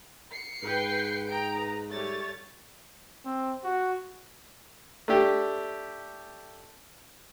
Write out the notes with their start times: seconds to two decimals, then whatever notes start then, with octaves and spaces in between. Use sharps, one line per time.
0.31 C7 C#7
0.63 G#2 B4 G5
1.27 D#4 G5 A#5 D7
1.57 B4
1.90 G3 A3 C#5 A6
3.25 C4
3.64 F#4
5.08 A3 D4 G4